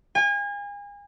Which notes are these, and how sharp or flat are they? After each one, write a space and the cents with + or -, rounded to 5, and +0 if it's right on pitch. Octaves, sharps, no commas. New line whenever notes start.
G#5 -35